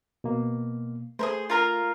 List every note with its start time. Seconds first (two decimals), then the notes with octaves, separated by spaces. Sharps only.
0.24 B2 A#3
1.19 A3 G#4 A#4 C5
1.50 F4 A#4 A#5